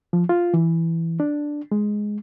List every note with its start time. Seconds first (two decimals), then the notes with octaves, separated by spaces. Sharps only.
0.13 F3
0.29 F4
0.54 E3
1.20 D4
1.72 G#3